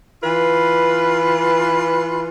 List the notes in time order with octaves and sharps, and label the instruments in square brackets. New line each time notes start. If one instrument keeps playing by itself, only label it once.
[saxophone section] E3 F4 B4